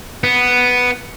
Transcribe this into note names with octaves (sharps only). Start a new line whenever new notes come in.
B3